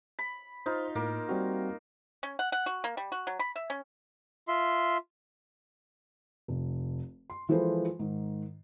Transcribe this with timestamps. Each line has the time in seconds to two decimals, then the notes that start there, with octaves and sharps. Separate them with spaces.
0.19 B5
0.66 D#4 F4 C5
0.96 A2 A#3
1.29 G3 C4 F#4
2.23 C#4
2.39 F#5
2.52 F#5
2.66 F#4
2.84 A#3
2.97 G3
3.12 F#4
3.27 F#3
3.39 B5
3.56 E5
3.70 C#4
4.48 F4 E5 C6
6.48 F1
7.30 C6
7.49 E3 F3 G#3 A4 B4 C5
7.99 G#2 D#3